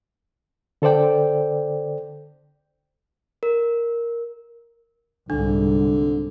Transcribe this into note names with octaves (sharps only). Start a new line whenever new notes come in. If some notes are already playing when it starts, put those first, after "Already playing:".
D3 A4 C5 D5 G5
A#4
C2 G#2 D3 D4